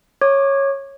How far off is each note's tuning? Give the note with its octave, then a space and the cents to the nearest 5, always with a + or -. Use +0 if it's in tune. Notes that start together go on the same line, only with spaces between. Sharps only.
C#5 -10 D6 +20